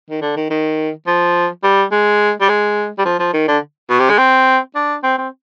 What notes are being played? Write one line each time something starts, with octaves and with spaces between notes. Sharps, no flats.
D#3
D3
D#3
D#3
F3
G3
G#3
G3
G#3
G3
F3
F3
D#3
D3
B2
C3
G#3
C4
D4
C4
C4